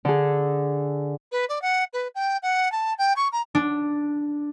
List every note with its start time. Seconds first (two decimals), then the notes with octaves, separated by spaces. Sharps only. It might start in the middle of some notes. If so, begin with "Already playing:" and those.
0.05 D3 G#4
1.32 B4
1.49 D5
1.62 F#5
1.93 B4
2.15 G5
2.43 F#5
2.72 A5
2.98 G5
3.16 C#6
3.32 A#5
3.55 D4